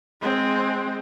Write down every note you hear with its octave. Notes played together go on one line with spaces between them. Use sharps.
G#3 C4